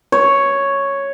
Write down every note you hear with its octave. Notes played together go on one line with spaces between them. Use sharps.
C#5